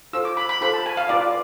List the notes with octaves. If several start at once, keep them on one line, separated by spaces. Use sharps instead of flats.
F4 A4 C5 E6
D6
B5
B5
F4 A4 C5 B5
A5
G#5
F5
F4 B4 D5